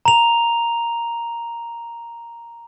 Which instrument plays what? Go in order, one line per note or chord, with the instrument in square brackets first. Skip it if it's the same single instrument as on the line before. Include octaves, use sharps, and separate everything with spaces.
[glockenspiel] A#5 F7